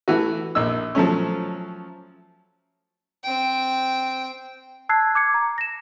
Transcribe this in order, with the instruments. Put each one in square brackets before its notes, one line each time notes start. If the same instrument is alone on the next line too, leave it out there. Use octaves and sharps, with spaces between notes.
[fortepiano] E3 A3 F#4
A#1 D#4 E6
F3 F#3 A3 C#4
[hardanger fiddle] C4 G5
[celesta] A5 E6 F#6 G#6 C7
D6 G#6 C#7
A#5
A#6 E7